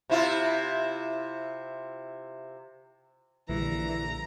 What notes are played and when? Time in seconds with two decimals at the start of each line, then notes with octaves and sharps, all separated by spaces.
0.10 C3 E4 F4
3.49 A#1 D3 E3 G3 A#5 A#6